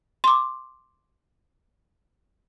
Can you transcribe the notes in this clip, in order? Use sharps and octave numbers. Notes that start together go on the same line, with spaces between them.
C6 D6